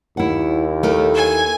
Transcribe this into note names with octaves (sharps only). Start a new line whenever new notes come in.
D#2 E4 F#5
A3 E4 A#4
G#5